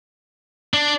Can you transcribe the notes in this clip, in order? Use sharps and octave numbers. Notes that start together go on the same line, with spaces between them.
D4